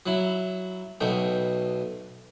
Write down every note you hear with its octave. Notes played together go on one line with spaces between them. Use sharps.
F#3 E4
B1 B2 A3 G5